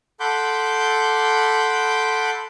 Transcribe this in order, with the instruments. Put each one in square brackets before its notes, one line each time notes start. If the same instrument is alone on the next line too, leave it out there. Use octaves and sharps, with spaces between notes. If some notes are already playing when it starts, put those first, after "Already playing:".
[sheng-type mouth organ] A4 F#5 B5 C6 D6 G6